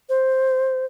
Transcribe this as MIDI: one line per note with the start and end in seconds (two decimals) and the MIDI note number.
0.09 0.85 72